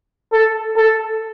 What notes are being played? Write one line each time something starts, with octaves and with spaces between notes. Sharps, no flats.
A4
A4